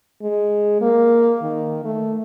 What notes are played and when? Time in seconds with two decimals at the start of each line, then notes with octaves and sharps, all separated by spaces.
0.22 G#3
0.81 A#3
1.42 D#3
1.85 A3